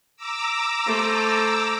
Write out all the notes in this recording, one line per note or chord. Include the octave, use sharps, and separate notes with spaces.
A#5 D6 E6
A3 C5